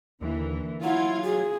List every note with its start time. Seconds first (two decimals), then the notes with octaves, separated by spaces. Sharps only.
0.21 D#2 D3 E3 A#3
0.83 F#3 E4 F4 F#5 G#6
1.24 F#4 G#4